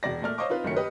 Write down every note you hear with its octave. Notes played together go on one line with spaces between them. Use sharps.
E1 B2 D5 A#6
A#2 A3 D5 F6
C5 C#5 D#5 F5 C#6 D6
C4 D#4 F4 B4 C5
F#1 D#3 F#3 A3 C#4 C#7
G4 B4 D#5